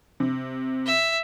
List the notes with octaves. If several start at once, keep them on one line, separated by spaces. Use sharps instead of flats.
C3
E5